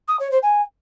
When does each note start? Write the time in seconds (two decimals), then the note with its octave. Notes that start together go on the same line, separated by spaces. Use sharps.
0.08 D#6
0.19 C#5
0.31 C5
0.42 G#5